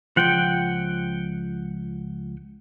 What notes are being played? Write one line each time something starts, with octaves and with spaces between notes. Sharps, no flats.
C#2 F3 F#5 G5